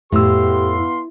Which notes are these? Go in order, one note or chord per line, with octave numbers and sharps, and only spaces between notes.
F2 A2 B3 G4 F5 C6 E6